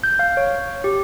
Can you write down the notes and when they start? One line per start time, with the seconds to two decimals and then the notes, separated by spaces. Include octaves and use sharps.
0.04 G6
0.19 F5
0.37 C#5
0.84 G4